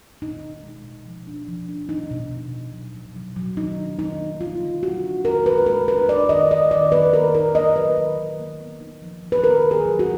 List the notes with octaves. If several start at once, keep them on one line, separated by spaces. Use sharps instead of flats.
B2 D#4
B2
G#3
B2
F3
D4
F3
D4
D4 D#4
B2
B2
B2
F#3
B2
F#3
F#3
D#3 D#4
D4
D#3 D#4
A#3
F#3 F4
D3
F#3 F#4
D4
D#3 A#4
G#3 B4
G#3 A#4
D4 B4
D#4 D5
D#3 D#5
D#3 D#5
D#3 D5
A#3 B4
D#3 A#4
D#4 A#4
A#3 D#5
F#3 B4
D#3
D#3
A#3
B3
D#4
F3
F3
B4
D#3 A#4
D#3
G#4
F#3
F#4